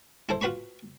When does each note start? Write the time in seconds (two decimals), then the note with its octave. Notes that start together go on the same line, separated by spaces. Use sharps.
0.29 E4 A4 C5
0.41 F4 F#4 B4 B5 C#6